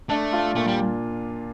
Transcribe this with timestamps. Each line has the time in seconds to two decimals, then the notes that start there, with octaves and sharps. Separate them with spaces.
0.09 A3 D4
0.33 F4
0.55 A#2 A3
0.67 G3